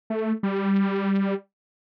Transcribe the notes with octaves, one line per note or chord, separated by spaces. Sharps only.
A3
G3